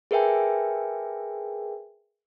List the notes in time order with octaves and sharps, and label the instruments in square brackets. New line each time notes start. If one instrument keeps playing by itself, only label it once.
[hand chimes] G#4 A#4 B4 E5 G5 G#5